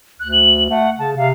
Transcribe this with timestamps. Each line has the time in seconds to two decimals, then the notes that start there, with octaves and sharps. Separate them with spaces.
0.20 D2 F#6
0.33 F#7
0.70 A3 F#5
0.99 C#3 A5
1.17 C3 F5